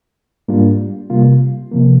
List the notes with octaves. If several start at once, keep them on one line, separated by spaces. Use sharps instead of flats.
G#2 G3 A#3 D4 F4
C3 G3 A#3 F4
C3 F3 A#3